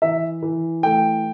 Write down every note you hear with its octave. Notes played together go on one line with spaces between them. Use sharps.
E3 E5
E3
A3 G5